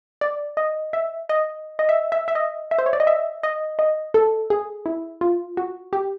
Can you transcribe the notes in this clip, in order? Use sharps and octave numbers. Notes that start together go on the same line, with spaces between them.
D5
D#5
E5
D#5
D#5
E5
E5
E5
D#5
E5
C5
C#5
D5
D#5
E5
D#5
D#5
A4
G#4
E4
F4
F#4
G4